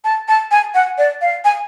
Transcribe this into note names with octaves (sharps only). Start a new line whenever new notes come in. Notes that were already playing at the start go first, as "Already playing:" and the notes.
A5
A5
G#5
F#5
D5
F5
G#5